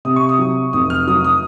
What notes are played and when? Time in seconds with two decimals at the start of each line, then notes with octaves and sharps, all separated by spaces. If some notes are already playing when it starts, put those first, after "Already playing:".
0.05 C3 D#6
0.16 C#6
0.29 D#6
0.39 F#3
0.73 F1 D#6
0.90 F6
1.07 F#3 D#6
1.24 D#6